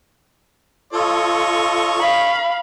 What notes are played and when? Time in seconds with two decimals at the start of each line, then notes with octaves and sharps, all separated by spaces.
0.93 F4 A4 C#5 D#5 C#6
2.00 F5 B5